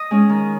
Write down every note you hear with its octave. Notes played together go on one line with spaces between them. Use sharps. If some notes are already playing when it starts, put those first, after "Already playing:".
Already playing: D#5
G#3 C#4
D#3